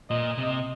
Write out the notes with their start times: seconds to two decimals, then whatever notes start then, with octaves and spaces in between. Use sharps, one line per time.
0.10 A#2 D#5
0.38 C3